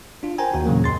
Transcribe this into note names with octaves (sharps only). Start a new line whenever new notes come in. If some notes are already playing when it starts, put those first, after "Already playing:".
D4 F4
A#4 C5 G5 G#5 A#5
D#2 F#4
A#2 C#3 E3 F#3 A#3
F2 C6 A6